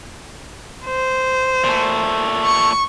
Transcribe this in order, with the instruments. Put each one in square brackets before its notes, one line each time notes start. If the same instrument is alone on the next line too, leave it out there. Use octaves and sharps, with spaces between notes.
[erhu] C5
[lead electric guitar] A#2 A3
[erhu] C#6